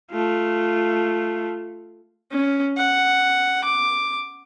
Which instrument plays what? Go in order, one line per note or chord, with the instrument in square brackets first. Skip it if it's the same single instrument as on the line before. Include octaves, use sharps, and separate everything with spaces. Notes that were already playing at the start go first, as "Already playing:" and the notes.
[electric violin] A3 F4
[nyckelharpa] C#4
F#5
D6